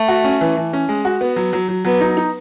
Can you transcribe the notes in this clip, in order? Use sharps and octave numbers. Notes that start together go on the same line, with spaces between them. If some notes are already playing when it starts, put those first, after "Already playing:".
Already playing: A3
F#4
C#4
E3
E3
C#4
G#3
F#4
B3
F#3
F#3
F#3
F#3 B3
D#4
D#4